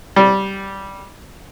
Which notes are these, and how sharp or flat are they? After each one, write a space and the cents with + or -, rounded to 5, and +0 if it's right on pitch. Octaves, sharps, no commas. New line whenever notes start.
G3 -10